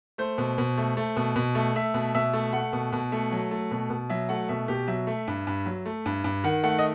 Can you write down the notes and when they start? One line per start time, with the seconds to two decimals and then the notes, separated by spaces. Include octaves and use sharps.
0.18 A3 C5
0.38 B2
0.58 B2
0.78 A3
0.97 A3
1.16 B2
1.36 B2
1.55 A3
1.75 A3 E5
1.94 B2
2.15 B2 E5
2.33 A3
2.53 A3 F#5
2.73 B2
2.93 B2
3.12 A3
3.32 F#3
3.51 A3
3.71 B2
3.90 B2
4.10 F#3 E5
4.29 A3 F#5
4.48 B2 E5
4.68 B2 G4
4.88 F#3 E5
5.07 A3
5.28 G2
5.47 G2
5.66 F#3
5.85 A3
6.06 G2
6.24 G2
6.44 D#3 F#5
6.63 A3 F#5
6.79 D#5